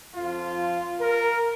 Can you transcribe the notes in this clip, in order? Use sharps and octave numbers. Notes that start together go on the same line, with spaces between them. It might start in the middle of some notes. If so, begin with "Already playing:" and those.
F2 F3 F4
A#4